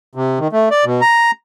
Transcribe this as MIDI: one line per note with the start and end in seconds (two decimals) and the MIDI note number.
0.15 0.39 48
0.39 0.48 51
0.53 0.69 57
0.71 0.85 74
0.85 1.01 47
1.01 1.31 82